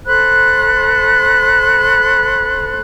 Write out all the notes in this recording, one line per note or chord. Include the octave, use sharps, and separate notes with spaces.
A4 C5 B5 F#6